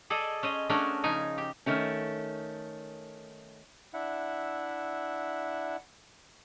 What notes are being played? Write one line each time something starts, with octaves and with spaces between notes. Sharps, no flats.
G#4 A4 D5 D#5
C#4 C5 D#5
A3 C#4 D4 F#4 G#4 A#4
C#3 F3 D#4 G#5
G4
D#3 A3 C#4
D4 E4 E5 F#5